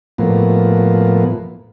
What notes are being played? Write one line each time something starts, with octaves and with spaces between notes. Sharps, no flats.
A2 F3 A#3 B3